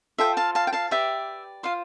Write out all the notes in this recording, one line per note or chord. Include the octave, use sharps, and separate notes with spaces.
F4 A4 C5 E5 G5
F5 A5
F5 A5
G5
F5 A5
G4 B4 D5 E5 G5
F4 C5 F5